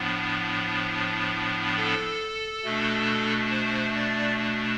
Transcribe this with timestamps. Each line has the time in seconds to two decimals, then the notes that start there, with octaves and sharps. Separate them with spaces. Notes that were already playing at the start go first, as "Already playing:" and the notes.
Already playing: A2 F3 B3 D4
1.77 A4
2.64 B2 A3 D4
3.51 C5
3.95 D5